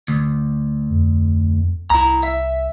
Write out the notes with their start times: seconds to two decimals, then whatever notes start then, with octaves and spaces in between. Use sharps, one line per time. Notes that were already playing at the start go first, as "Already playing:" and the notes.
0.08 D2
0.90 F2
1.90 C2 E4 A#5
2.23 E5